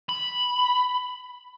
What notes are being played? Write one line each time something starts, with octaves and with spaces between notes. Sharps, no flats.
B5